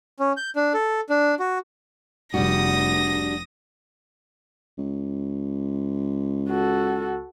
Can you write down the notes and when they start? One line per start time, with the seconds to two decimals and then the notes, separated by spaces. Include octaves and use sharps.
0.20 C#4
0.37 G6
0.56 D4
0.74 A4
1.10 D4
1.40 F#4
2.34 F1 G3 D4 F#4 D#6 A#6
4.78 C#2
6.49 F#4 A4